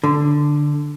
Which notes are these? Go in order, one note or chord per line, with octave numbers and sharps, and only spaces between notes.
D3